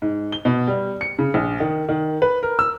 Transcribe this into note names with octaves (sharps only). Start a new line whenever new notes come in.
G#2
G7
B2
G3
C#7
C#3
A#1
D#3
D#3
B4
A#4
E6